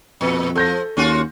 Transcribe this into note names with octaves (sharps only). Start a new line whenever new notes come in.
F2 A#2
F3 A4 G6 A#6
D#2 C#4 F4 F#4